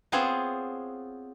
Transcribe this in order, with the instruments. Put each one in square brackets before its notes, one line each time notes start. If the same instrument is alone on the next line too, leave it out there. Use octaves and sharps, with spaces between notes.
[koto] B3 C4 F4 G#4 C5 C#5